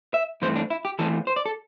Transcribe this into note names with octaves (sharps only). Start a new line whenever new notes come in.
E5
G2 E3 A3 C4 C5
D4
E4
G4
E2 E3 A3 C4 A4
C5
D5
A4